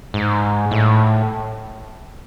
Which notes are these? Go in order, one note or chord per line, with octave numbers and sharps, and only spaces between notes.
G#2
A2